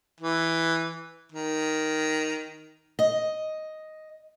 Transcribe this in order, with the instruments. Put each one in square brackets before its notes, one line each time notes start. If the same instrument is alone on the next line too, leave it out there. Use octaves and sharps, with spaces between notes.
[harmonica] E3
D#3
[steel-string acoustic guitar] D#5